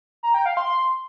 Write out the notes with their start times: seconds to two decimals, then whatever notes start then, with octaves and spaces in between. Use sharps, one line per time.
0.23 A#5
0.34 G5
0.46 F5
0.57 C6